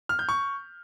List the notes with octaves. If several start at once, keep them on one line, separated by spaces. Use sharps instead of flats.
F6
G6
C#6